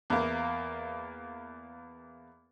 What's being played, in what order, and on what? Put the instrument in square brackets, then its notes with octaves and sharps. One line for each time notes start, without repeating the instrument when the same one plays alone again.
[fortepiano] E2 A#3